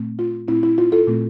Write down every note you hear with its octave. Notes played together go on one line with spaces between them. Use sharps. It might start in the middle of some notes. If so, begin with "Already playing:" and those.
Already playing: A#2 A3 C4
F4
A#2 A3 C4 E4
E4
F4
F4 A4
A#2 A3 C4